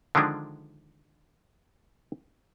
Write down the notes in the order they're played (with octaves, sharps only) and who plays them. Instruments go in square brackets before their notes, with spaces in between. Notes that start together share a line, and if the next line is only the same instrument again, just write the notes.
[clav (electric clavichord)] D3 D#3 F3 G#3 D4